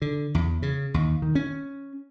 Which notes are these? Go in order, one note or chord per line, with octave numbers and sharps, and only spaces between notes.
D3
E2
C#3
D#2
D#3
C#4